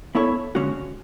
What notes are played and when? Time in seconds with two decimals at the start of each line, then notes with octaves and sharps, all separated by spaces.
0.15 B3 E4 A4 C#5
0.55 D3 G#3 C#4 F#4